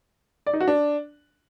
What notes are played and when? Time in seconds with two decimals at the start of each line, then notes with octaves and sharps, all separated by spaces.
0.46 D5
0.54 D#4
0.61 F#4
0.68 D4